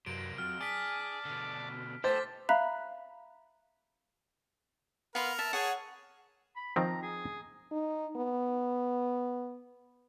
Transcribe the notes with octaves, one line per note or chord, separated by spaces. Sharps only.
F#2 C3 A#3 D7
F2 F#3 F6
G#4 D5 A5 B6 D7
B2 D3
G4 A4 C5 D6 A6 B6
E5 F5 A#5 B5 F#6 B6
B3 A#4 F5 B5 C6
E5 A5
G#4 C#5 F#5
B5
D#3 F3 C4 A#5
G#4
D#4
B3